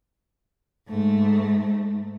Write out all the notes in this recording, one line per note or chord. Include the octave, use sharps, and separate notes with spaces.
G#2 A3